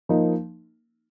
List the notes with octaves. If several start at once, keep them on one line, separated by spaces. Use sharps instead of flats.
F3 A#3 D#4